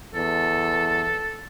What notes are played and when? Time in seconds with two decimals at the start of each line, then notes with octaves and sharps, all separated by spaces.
0.14 E2 A4